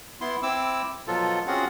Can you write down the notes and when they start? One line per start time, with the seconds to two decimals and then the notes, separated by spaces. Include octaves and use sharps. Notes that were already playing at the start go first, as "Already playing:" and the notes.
0.21 B3 E4 C6
0.43 C4 E4 D6 E6
1.07 B2 F3 F#3 F4 A4
1.47 C4 C#4 F4 F#4 G#4 F#5